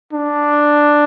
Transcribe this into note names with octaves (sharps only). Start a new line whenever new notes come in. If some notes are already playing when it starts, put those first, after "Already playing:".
D4